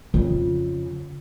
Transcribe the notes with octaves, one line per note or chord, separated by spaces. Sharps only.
F2 C#3